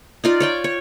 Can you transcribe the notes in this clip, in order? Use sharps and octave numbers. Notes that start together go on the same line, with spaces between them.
D#4 F4 D5
C#5 D5 G5
C#5